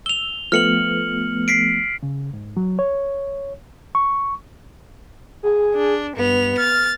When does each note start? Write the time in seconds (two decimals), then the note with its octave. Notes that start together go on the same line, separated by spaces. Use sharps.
0.06 E6 F7 G7
0.52 F3 A3 B3 F6 C#7 F#7
1.48 B6 C7 D7
2.03 C#3
2.34 G#2
2.57 F#3
2.79 C#5
3.95 C#6
5.43 G#4
5.74 D4
6.16 G2 B3 F7
6.58 F6 A6